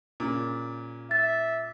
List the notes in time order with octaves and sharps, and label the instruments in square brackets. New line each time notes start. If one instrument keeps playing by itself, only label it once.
[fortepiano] A#2 C#3
[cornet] E5 [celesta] A6